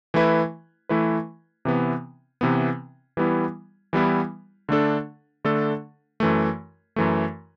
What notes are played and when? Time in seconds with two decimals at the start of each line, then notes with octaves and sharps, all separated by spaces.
0.14 E3 A3 E4 B4
0.89 E3 A3 E4 B4
1.65 C3 E3 B3
2.41 C3 E3 B3
3.17 E3 G3 B3 E4
3.93 E3 G3 B3 E4
4.69 D3 A3 D4 A4
5.45 D3 A3 D4 A4
6.20 F#2 E3 A3
6.96 F#2 E3 A3